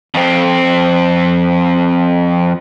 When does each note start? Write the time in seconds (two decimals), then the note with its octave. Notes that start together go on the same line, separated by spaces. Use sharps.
0.14 F2 C4